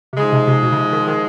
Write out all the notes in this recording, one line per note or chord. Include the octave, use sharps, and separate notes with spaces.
C3
G#2 C#3 F3 G#3
C3
C3
B2
C#3
C3
D#3
D#3